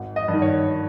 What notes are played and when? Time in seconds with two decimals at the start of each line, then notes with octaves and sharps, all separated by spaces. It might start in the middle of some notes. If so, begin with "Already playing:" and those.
Already playing: G#1
0.16 D#5
0.28 G2
0.33 D#3
0.42 C#5